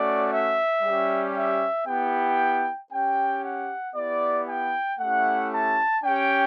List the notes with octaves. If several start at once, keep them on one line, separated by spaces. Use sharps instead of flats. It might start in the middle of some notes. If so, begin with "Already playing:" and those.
Already playing: A3 C#4 F#4 D5
E5
G3 C#4 G4
E5
B3 E4 G4 G5
C#4 G4 G5
F#5
B3 E4 G4 D5
G5
A3 C#4 E4 G4 F#5
A5
C#4 G4 G5